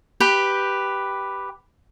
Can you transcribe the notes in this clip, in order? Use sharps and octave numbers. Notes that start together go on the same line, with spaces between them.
G4 B4 G5